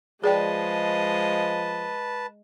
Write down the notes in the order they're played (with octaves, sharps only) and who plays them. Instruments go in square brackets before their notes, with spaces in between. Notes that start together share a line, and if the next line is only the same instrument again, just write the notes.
[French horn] F3 [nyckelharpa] G#3 D#5 [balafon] G#4 D5 G5 [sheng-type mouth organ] B4 A5